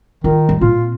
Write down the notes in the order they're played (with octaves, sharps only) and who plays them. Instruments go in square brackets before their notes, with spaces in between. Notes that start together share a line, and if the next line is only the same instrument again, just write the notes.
[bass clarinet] D#3 [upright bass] F4
[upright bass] G3
[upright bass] A#2 C4 [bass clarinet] F4